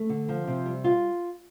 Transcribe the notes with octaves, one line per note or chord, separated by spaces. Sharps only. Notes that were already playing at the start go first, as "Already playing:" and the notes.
Already playing: A3
D3
F3
C3
G3
F4